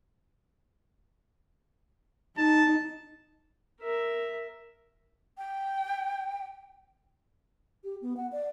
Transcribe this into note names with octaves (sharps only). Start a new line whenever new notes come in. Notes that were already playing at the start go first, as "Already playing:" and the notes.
D#4 A5
A#4 E5
G5
G4
B3
F#5
D5